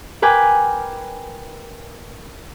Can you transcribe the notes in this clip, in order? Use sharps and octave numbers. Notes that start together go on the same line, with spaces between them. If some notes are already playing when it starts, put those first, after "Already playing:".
A#4 B4 G5 G#5 D6